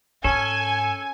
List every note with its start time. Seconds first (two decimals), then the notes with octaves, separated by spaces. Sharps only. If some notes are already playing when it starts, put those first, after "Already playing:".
0.24 G#2 C#4 A4 G#5